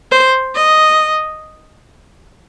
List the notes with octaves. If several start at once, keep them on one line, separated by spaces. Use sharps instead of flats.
C5
D#5